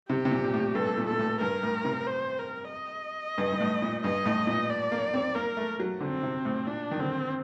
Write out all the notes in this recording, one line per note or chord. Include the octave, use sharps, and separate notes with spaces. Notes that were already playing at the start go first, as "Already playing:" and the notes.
C3 G4
C3
A#2
A#2
A2
G2 A4
A#2
A#2 A4
A2
G2 A#4
A2
C3
C5
A#4
D#5
G2
G2
A2
A#2
G2 D#5
A2
A#2
D5
A#3
C4
A#3 A#4
A3
F#3
D3 C4
C3
A2
A#2 D4
D#3
D3 C4